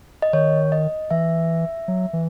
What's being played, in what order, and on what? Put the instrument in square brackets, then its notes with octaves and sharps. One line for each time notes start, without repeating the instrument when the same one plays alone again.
[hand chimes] D#5
[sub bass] D#3 [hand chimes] C#5
[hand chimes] D#5
[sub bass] E3 [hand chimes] E5
[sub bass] F#3
E3